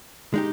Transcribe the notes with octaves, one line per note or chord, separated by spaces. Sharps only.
G#3 D#4 G4